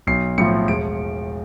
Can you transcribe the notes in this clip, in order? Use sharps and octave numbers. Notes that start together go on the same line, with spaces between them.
B1 C7
A2 F3 C#7
E1 D7